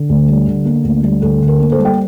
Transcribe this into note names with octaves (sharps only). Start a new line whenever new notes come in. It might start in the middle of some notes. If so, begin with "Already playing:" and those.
Already playing: D3
D2
G3
D3
A#3
D2
G3
D2 A4
D3
A#4
A#3
A4 C5
G3
G5